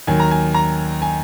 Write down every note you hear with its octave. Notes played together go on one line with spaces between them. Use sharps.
D#2 D#3 F#3 G#5
A#5
G#5
A#5
G#5